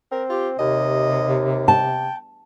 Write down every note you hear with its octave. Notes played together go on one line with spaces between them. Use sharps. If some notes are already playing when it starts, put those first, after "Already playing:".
C4 A#4
F4 G4
D#2 C3 D#5
G5 A5